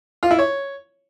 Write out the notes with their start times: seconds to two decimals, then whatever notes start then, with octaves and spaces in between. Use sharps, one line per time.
0.23 F4
0.31 E4
0.39 C#5